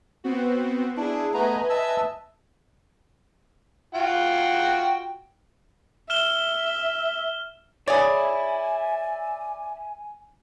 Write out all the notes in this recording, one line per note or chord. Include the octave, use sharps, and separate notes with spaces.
B3 C4 F#4
D4 E4 G#4
A3 B3 B4 D#5 G#5 A#5
E5 A5 E6
F4 F#4 G5
E5 F6 E7 G7
G#4 C#5 D5 E5 G#5 B5